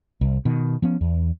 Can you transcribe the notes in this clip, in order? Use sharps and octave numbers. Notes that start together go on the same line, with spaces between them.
C2
B2 D#3
F3 B3 C#4
E2